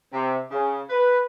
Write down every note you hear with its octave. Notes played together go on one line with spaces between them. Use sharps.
C3
C#3
B4